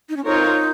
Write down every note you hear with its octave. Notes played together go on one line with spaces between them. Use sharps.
D#4
C#4
C4 D#4 F4 A#4 C#5